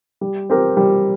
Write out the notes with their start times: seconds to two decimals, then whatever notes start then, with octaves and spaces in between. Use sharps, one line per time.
0.21 G3
0.50 C4 G4 A#4
0.77 G3